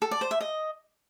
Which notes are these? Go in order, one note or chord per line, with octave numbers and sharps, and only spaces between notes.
A4
D5
C5
E5
D#5